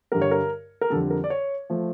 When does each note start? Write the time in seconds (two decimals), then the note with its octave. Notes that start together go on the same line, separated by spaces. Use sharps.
0.12 G2 D3 G3 A#4
0.22 C#5
0.31 A#4
0.81 A#4
0.90 F2 D3 G3 A4
1.10 A#4
1.24 D5
1.30 C#5
1.70 F3 A3